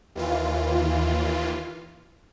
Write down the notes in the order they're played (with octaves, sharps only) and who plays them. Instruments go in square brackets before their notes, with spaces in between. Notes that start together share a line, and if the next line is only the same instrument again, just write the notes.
[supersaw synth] D#2 E3 F4